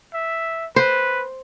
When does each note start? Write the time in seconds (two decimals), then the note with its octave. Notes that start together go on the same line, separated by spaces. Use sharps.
0.14 E5
0.76 B4 C5